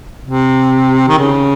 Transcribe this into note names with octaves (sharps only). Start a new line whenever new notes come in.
C3
D#3
C#3